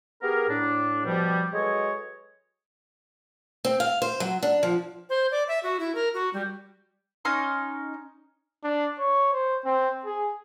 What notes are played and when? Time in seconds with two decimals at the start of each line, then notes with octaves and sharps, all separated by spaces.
0.22 B3 G4 G#4 A#4
0.50 A2 D4
1.05 B2 F3 G3
1.53 F#3 G#3 A4 B4 C#5 D#5
3.65 C4
3.80 F5
4.02 C5
4.20 F#3
4.43 D4
4.63 F3
5.09 C5
5.31 D5
5.48 E5
5.63 F#4
5.80 E4
5.95 A#4
6.14 F#4
6.34 G3
7.25 C#4 D#4 C6
8.64 D4
8.99 C#5
9.33 C5
9.65 C4
10.05 G#4